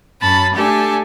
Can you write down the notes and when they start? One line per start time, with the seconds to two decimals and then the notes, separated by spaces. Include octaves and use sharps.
0.21 F#2 C#4 A5 B5
0.53 A3 D4 G4 A4 G#5